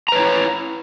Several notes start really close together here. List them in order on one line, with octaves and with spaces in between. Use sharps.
A#5 B4 C#5 E4